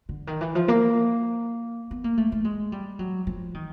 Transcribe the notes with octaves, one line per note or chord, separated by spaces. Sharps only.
D3
D#3
E3
F3
A#3
B3
A#3
A3
A3
G#3
G3
F#3
F3
D#3